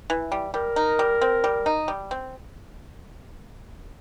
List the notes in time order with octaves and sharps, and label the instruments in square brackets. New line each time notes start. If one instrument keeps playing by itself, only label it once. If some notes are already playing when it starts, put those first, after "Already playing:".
[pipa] E3
G3
[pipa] G3 [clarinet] A#4
[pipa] D#4
G3
C4
G3
D#4
G3
C4